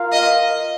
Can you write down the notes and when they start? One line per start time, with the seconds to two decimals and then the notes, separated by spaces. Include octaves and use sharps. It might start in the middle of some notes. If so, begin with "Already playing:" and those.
Already playing: F4 A#4 F5
0.12 D#5